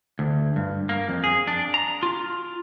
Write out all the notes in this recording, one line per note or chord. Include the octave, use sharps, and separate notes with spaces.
D2
G2
A#3
F2
G#4
D4
A#5
F4